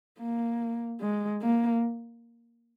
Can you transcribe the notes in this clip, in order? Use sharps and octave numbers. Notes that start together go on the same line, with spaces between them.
A#3
G#3
A#3